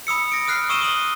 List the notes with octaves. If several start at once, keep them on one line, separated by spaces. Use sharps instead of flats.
B5 D#6 E6 C#7
A#6 D7
D#6 F6 F#6 C7
C#6 D#6 E6 D#7 E7 G7
D#6 F#7 G7